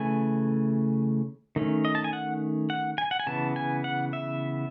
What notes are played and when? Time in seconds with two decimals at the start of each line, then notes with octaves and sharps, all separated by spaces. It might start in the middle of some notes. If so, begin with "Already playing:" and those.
Already playing: C#3 E3 A3 G#5
1.56 D#3 A3 C#4
1.85 D#5
1.95 A5
2.04 G#5
2.13 F#5
2.70 F#5
2.98 G#5
3.11 F#5
3.20 G#5
3.27 C#3 E3 B3 A5
3.56 G#5
3.84 F#5
4.13 E5